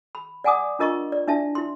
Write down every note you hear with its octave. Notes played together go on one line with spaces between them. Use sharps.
B5
D5 F#5 G#5 A#5 D6 D#6
D4 F4 A#4 D#5 A#5 C#6
D5
D4 E4 E5 A5
E4 C6